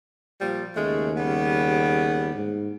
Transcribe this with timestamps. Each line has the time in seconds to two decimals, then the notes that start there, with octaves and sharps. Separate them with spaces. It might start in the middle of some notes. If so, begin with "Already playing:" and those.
0.40 A#2 F3 G3
0.76 D#2 C#3 G#3 A3
1.17 C#3 G3 B3
2.35 G#2